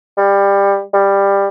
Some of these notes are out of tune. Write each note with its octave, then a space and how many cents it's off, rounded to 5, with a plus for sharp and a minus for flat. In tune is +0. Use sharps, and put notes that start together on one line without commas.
G3 +20
G3 +15